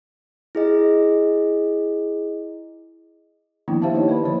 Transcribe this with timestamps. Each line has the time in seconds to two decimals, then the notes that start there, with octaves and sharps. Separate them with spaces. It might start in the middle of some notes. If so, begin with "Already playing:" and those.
0.55 E4 G#4 D#5
3.68 D#3 F3 A#3 B3 D4 E4
3.82 G4 C5 E5 F5 A5
3.94 D#4 E4 C#5 D#5
4.08 A#3 B4 D5 B5
4.25 D3 F3 C5 B5